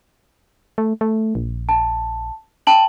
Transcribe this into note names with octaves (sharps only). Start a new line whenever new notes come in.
A3
A3
A#1
A5
G5 A5 F#7